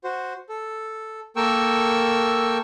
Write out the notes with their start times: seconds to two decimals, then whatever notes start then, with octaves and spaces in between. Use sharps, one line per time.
0.04 F#4 C5
0.49 A4
1.36 A#3 A4 A#4 G5 C#6 E6